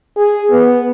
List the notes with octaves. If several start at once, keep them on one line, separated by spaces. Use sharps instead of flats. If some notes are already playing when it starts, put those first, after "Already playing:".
G#4
B3